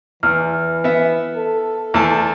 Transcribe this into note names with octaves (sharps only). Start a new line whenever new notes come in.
E2 E3 F6
B3 E5
A4
E2 A3 A5